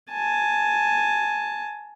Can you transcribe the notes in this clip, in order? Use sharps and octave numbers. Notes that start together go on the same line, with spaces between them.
G#5 A5